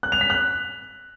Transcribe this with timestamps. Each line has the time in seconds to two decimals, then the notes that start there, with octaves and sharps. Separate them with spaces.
0.03 F#6
0.12 F7
0.21 B6
0.30 F#6